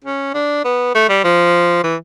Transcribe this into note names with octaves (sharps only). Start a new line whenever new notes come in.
C#4
D4
B3
A3
G3
F3
E3